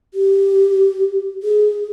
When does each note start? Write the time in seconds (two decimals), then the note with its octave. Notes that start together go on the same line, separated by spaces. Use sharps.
0.14 G4
1.43 G#4